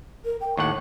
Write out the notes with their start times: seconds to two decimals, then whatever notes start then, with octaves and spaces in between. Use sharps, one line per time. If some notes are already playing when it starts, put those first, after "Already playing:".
0.25 A#4
0.41 G5
0.57 D#2 A2 F#5 C#6